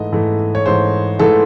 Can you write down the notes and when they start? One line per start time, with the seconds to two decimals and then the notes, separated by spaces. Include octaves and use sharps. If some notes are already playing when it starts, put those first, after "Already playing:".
Already playing: G#2 E3 A3 D#5
0.12 G#2 E3 A3
0.55 C#5
0.66 G#2 E3 A3 C5
1.19 G#2 E3 A3 A4